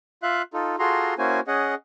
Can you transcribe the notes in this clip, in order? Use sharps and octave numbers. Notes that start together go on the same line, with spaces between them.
F4 E5 F5 F#6
D#4 F4 A4
F4 F#4 G#4 A4 A#5 C6
A#3 C#4 E4 F#4 C5 G#5
C#4 G#4 D#5 F#5